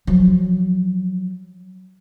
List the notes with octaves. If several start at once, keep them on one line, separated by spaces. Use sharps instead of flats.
F3 F#3